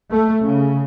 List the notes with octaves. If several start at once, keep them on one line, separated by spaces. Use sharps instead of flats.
A3
C#3